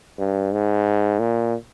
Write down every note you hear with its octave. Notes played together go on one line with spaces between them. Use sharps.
G2
G#2
A#2